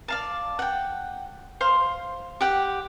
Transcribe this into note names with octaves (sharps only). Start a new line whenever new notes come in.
D5 F5 A5
F#5 G5
C5 F5 C6
G4 F#5 G5